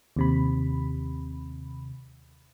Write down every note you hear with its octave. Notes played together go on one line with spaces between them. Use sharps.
D#2 C3 B5